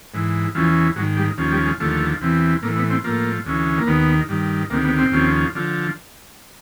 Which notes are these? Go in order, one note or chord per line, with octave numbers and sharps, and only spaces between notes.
G#2 E3
E2 C#3 E3 F3
G#2 D#3 F#3
G3
D#2 C#3 F3
G3
G#3
D#2 D3 F3 A3
E2 C3 E3
A2 E3 A#3
B3
C4
A2 F3 A#3
D2 C#3 E3
A#3
D#2 D#3 B3
G2 D#3
D2 C3 D#3 A#3
B3
C4
D#2 C#3 F3
D3 F3